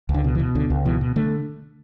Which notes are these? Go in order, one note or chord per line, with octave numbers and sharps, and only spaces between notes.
C#2
D3
B2
E3
B2
C#2 D3
C#2
B2 E3
B2
D3 A3